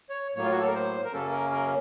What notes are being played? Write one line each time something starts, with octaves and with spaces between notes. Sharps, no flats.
C#5
A2 F#3 A#3 C#5
F4
F#4
A4
A#4
C5
A#4
F#2 C#3 F#3 A#3 C#4 A4
A#4
A#4